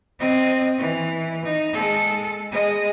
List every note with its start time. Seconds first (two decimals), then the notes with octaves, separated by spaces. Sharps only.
0.19 C4 D#5
0.78 E3
1.44 D#4
1.73 G#3 A4
2.51 G#3 D#5